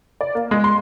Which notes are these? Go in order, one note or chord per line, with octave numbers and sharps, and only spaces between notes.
D5
A#3
G#3
C6